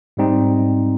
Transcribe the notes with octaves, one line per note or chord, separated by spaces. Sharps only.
G#2 G3 C4 D#4